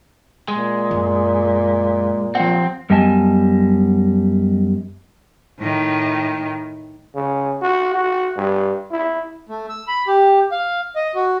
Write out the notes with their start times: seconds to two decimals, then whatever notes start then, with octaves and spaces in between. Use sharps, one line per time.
0.48 A#2 G#3
0.91 F#2
2.35 F3 C4 F#5
2.90 F#2 G3 B3 D#5 G#5 A5
5.60 A2 D#3
7.15 C#3
7.62 F#4
7.94 F#4
8.37 G2
8.92 E4
9.49 A3
9.69 E6
9.88 B5
10.07 G4
10.52 F5
10.96 D#5
11.15 F#4